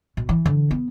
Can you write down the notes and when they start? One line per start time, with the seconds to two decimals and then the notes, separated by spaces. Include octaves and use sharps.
0.17 B2
0.29 E3
0.46 D3
0.71 B3